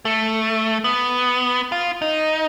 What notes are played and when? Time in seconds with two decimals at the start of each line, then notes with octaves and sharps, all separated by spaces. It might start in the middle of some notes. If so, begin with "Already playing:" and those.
0.05 A3
0.84 B3
1.72 F4
2.02 D#4